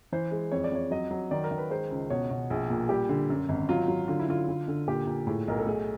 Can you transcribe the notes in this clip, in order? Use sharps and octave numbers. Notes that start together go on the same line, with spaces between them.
E3 C5
G#3
F2 C#5
D5
F2 C#5
F#3 D#5
F#3
D#3 D5
A#4
D#3
B4
G#3 C5
C#2
B2 C#5
B2
A#1 G#4
A#2
G3 G4
D3
F#2
G#1
F#3 F4
F#3
D3 F4
E4
D3 F4
D3
D3
A#2 G4
A#2
A2 G#4
B1 A#4
A4
A3 G#4